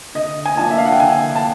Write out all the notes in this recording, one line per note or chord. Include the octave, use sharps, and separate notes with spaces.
D3 D#5
G#5
F3 A#3 D4 F4 A5
E5
F5
F#5
G5
D3 G#5
A5